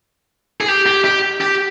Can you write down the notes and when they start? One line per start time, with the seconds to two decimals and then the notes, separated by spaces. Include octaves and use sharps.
0.61 G#4
0.68 G4
0.86 G4
1.05 G4
1.41 G4